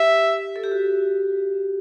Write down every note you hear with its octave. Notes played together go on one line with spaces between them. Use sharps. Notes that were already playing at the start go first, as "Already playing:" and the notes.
Already playing: G4 E5
A4
G4
F#4